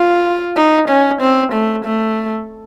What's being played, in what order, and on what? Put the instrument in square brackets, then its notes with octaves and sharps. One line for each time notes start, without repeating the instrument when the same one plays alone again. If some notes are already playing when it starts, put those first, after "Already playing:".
Already playing: [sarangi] F4
D#4
C#4
C4
A3
A3